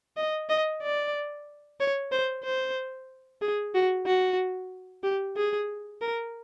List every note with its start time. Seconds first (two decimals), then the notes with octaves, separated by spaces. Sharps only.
0.17 D#5
0.49 D#5
0.82 D5
1.80 C#5
2.12 C5
2.44 C5
3.42 G#4
3.75 F#4
4.06 F#4
5.04 G4
5.36 G#4
6.01 A#4